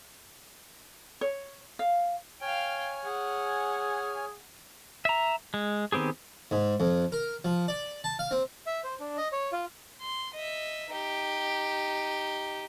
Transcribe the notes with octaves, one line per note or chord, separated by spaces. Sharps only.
C#5
F5
C#5 F5 G5 G#5 F6
G#4 F#5
E5 A#5
G#3
D#3 B3 C4 G4 G#4
G#2
F2
A#4
F3
D5
A5
F5
C4
E5
C5
D4
D#5
C#5
F4
C6
D#5 E5
D#4 G4